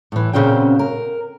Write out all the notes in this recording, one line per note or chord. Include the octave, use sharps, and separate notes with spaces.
A2 E3
A#2 C#3 C4 C#4 F#4 G5
A#4